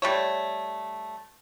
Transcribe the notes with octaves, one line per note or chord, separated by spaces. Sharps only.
G3 A3 C#5